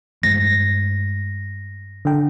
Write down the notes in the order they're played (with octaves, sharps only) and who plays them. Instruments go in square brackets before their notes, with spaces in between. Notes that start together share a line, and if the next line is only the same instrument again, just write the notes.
[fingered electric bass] G2 G#3 A3 [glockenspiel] A#6
[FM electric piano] D3 G5